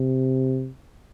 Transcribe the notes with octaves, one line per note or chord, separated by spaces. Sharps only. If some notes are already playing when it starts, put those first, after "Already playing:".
Already playing: C3